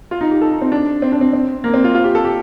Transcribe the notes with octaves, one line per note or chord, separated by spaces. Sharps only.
F4
D#4
G4
A4
D#4
C4
D4
C4
D4
C4
C4
A#3
C4
F4
F4
G4
A4
G4